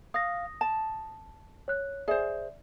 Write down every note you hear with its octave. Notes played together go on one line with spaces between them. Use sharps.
F5 D#6 A#6
A5
C#5 F#6
G#4 C5 D5 E5